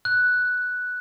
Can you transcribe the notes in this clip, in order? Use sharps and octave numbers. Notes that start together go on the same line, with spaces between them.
F#6